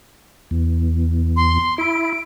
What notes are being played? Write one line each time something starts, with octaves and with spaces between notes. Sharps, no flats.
E2
C6
E4 D7